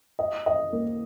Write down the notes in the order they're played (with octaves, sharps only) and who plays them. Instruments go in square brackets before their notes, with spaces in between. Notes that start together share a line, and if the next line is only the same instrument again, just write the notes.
[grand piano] D#5
D#5
A#3